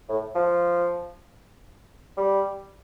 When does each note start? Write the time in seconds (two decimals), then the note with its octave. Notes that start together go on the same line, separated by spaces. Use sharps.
0.09 A2
0.35 F3
2.17 G3